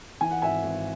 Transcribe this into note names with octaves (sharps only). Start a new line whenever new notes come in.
E3 G#5
F#5
G#1 E5 G#5
G#1